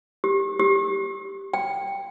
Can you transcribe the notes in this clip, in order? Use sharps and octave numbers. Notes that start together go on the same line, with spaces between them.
G4
G4
G5